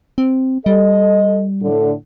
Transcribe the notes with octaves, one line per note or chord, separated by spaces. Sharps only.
C4
G3 A4 D#5
A2 D3